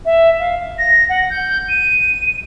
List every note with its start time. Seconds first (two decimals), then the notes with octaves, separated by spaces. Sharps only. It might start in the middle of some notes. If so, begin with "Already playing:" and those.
0.05 E5
0.39 F5
0.78 A#6
1.09 F#5
1.30 G6
1.69 D#7